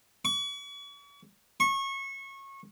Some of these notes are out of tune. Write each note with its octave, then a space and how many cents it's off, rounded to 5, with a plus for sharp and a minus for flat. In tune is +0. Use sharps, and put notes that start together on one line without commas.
C#6 +40
C#6 -25